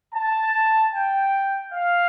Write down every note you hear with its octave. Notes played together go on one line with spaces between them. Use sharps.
A5
G5
F5